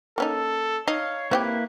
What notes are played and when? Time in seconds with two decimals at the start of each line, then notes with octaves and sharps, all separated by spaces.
0.18 A#3 C#4 D#4 A4
0.88 D#4 C#5 F5
1.31 A#3 C4 E4 F#4 G4 B4